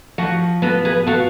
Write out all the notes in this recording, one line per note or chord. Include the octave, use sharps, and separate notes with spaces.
F3 F#4
B3 F#4 A4
G#4 B4
F4 F#4 A4